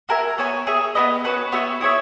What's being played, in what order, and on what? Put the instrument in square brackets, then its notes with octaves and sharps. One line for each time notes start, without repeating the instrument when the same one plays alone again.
[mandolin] F#4 A#4 E5 G#5
B3 F#4 C#5 G#5
G#4 C#5 E5
B3 E4 B4 D#5
C#4 F#4 B4 F#5
B3 F#4 C#5 E5
E4 G#4 C#5 E5